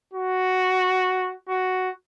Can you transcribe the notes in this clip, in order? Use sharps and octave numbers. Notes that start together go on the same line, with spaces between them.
F#4
F#4